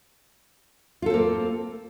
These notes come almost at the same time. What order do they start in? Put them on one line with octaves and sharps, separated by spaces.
F4 A4 C4 A#3